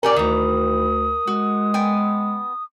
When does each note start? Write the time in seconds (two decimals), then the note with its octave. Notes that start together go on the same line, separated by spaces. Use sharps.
0.03 C#4 G4 A#4 D5 G#5
0.16 D2 D#3 E3 D#6
1.27 G#3 F#4
1.74 B3 G5 G#5